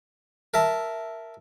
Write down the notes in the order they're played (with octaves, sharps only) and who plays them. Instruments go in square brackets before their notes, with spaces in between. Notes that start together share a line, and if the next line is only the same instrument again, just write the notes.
[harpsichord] A#4 E5 A5